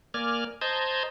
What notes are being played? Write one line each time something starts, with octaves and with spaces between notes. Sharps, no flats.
A#3 D5 G#5 F6
C5 D#5 A5 A#5 G6 G#6